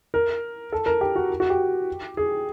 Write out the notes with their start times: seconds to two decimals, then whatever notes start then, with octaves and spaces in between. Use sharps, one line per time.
0.14 A#4
0.72 A4
0.86 A#4
1.01 G4
1.16 F#4
1.40 F#4
1.50 G4
2.17 G#4